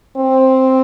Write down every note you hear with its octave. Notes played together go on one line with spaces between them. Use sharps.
C4